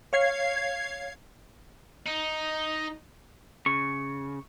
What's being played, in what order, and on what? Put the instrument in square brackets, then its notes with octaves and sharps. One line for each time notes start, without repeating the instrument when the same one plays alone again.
[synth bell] C#5 F5 G#6 C7
[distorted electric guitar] D#4
[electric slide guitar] C#3 [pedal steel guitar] C#6